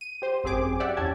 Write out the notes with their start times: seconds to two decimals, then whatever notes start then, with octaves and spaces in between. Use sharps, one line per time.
0.01 D#7
0.22 G4 C5
0.44 G#1 F#2 C4 G4 G#4 D6
0.80 F#4 G4 D5 E5 F#5
0.97 E2 C#4 G4 A5 G#6